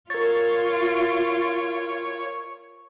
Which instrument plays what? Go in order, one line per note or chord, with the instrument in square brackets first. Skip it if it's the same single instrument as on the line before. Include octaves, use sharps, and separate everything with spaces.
[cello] F4 [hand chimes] A#4 A6 [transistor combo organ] C#5